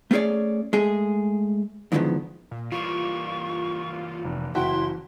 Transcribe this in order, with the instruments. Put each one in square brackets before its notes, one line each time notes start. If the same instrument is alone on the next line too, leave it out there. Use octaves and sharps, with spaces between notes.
[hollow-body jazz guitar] A3 B3 C#4 G#4 C#5 D5
G#3 A3 G#4
E2 G#2 D3 D#3 F3 B3
[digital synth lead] A#2
[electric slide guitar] E3 G3 A#3 [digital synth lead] F4 [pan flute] C#6
[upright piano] F1
[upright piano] F#1 F#4 G5 [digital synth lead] E4 [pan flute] C6